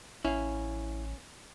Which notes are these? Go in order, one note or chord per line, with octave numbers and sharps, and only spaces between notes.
A1 C#4 E4 F5